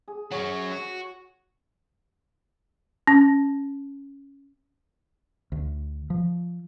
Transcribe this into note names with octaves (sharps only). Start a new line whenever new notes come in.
G#4
F#3 C#4 C#5
F#4
C#4
D2
F3